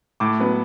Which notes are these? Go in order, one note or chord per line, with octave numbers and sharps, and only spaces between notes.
A2 D6
F#3 B3